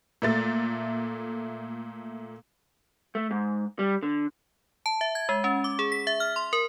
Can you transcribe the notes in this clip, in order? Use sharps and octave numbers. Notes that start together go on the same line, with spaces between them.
A#2 A3 A6
A3
G#2
G3
D3
A5
E5
G#6
G#3
C#4
D6
G#4
B6
E5
F6
C6
A#4